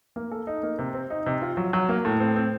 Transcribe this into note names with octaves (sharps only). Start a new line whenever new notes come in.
A#3
A4
D#4
A#3
C3
C4
D#4
C3
F4
F#3
F#3
A#3
A2
C4
C4